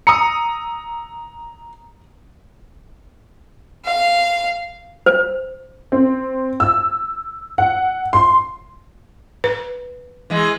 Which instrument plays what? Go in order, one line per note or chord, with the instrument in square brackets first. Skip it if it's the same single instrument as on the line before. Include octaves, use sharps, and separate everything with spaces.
[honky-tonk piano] A#5 [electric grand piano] D#6 E6 C#7
[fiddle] F5
[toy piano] C5
[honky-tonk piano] C4
E6
F#5
C6
[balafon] B4
[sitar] E3 G#3